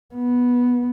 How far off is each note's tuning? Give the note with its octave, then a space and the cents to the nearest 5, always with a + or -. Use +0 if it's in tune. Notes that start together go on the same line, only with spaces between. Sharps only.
B3 -10